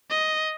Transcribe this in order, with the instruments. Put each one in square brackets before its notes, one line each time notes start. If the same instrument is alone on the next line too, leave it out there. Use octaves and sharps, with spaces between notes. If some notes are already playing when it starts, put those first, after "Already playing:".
[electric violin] D#5